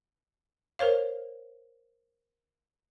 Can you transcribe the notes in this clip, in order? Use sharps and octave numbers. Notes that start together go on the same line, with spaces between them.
A#4 C5 C#5 F5